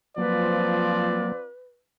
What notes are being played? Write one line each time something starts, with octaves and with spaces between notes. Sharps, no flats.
F3 F#3 A#3 C4 F4 B4 D5